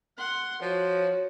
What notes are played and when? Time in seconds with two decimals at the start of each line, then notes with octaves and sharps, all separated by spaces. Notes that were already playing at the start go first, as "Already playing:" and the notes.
0.18 F#5 C6
0.62 F3 F#4 C#5